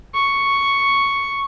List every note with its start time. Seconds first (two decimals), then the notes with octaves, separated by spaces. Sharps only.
0.14 C#6